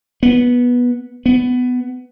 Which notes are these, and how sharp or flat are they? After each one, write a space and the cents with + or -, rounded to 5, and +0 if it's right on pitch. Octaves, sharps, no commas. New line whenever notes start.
B3 -15
B3 +15